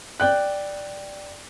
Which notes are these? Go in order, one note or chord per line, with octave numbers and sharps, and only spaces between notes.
D5 G5 F#6